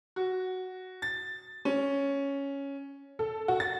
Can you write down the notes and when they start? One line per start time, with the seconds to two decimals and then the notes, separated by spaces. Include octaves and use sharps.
0.16 F#4
1.02 A6
1.65 C#4
3.19 A4
3.48 F#4
3.60 A6